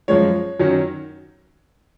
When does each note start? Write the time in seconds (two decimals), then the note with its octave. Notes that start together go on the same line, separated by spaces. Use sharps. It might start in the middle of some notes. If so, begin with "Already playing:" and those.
0.08 F#2 F3 G#3 C#5
0.59 F#2 D#3 F#3 C#4